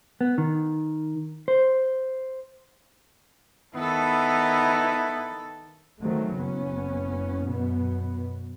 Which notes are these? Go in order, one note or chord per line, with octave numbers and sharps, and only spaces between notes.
B3
D#3
C5
D#3 B3 E4 A4
D#3 F#3 A3 C4
F#1 B3 C#4
F#2 B2 B3